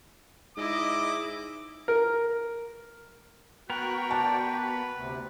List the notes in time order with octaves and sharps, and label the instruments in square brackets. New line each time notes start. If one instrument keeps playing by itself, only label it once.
[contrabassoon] G#2 [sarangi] E4 [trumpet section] D5 D#5 [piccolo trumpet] D6
[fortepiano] A#4
[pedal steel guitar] B3 A#4 [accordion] F#4 G5 [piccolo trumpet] F#6
[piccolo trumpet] D5 [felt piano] A5
[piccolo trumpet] B4
[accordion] D2 C3